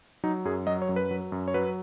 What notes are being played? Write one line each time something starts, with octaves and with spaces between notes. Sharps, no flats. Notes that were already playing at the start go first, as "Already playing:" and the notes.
F#3 D#4
F#2 G#4
F#3 D#5
C#5
F#2
B4
F#3
F#2
C#5
F#3 B4